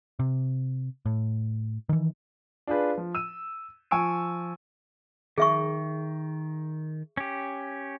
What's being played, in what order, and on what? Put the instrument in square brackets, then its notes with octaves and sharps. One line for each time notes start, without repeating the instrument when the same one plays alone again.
[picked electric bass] C3
A2
D#3 E3
[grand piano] D4 F4 G#4 B4
F3
E6 D#7
F3 G#5 C#6 E6 D7
[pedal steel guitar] D#3 [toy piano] G#4 E5 C#6
[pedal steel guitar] C#4 G4